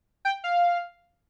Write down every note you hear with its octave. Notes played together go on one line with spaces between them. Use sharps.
G5
F5